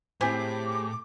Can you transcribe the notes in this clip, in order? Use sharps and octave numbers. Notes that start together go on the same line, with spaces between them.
A2 C4 E4 G4 G#4 C5 D6